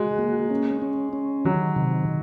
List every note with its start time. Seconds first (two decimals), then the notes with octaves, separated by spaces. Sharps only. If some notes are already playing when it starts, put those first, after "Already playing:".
Already playing: G#3 F#4
0.19 A#3
0.50 C#4
0.82 C#4
1.13 C#4
1.45 D#3 F#3
1.76 C3